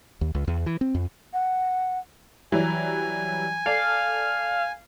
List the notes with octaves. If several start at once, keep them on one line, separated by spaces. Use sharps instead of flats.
D#2
C#2
E2
E3
C4
F2
F#5
E3 F#3 G3 G#5
A4 D5 F5